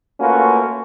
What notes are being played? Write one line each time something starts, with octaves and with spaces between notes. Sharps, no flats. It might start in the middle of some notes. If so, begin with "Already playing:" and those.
A3 A#3 C#4 F4 F#4 B4